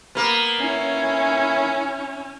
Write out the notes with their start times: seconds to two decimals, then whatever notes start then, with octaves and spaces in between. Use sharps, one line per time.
0.15 A#3 B3
0.61 C#4 E4 C#5